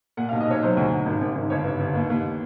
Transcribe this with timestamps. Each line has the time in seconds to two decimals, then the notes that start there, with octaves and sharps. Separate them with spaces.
0.17 A#2 F#5
0.29 F5
0.32 B1
0.41 D#5
0.47 B1 C#5
0.63 F#3 C5
0.77 D2
0.92 D2
1.06 G#1
1.21 G#1
1.35 G#1
1.50 G1 C#5
1.66 G1
1.80 G1
1.95 D#2
2.10 D#2